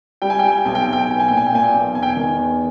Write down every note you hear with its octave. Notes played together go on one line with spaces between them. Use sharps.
G3 G5
G#5
G5
G3 G#5
G5
B1 G#5
G5
B1 G#5
G5
G#5
B1 G5
G#5
A#2 G5
G#5
G5
A#2 G#5
G5
B1
E2 G#5
G5
G#5
D#3
E2